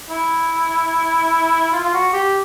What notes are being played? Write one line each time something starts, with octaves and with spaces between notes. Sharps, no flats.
E4
F4
F4
F#4
G4